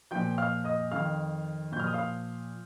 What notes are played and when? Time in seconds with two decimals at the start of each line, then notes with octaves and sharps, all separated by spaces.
0.11 A#2 F3 G5 G6
0.38 F5 F6
0.64 D#5 D#6
0.91 F2 D#3 F5 F6
1.72 A#2 G6
1.76 F3 F6
1.87 D#6
1.94 F5 F6